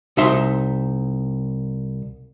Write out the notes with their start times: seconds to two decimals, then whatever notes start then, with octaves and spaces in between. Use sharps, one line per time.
0.17 C2 D#4 E5 C6